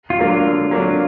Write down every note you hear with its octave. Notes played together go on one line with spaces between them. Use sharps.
F4
F#3 A#3 D4
F4
D3
F#3 A#3 D4